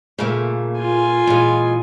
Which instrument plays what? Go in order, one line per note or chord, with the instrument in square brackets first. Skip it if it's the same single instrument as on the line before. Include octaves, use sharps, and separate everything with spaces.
[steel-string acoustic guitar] A#2 A3 [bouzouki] C#3 A#3
[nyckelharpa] F4 G#5
[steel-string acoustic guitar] A#2 [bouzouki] E3 G#3